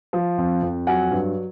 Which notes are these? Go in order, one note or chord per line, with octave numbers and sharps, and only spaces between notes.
F3
F2
F2
F#3 F#5 G#5
G2